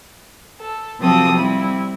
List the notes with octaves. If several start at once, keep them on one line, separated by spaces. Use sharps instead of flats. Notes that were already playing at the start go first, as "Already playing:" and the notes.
A4
C3 F3 F#3 C4 A4 D#6
G3 C4 E4